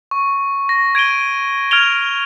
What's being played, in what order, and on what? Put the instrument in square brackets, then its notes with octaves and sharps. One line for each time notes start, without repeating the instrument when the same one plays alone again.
[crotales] C#6
A#6
G#6 D7 D#7 G7
F6 G#6 D7 F7 G7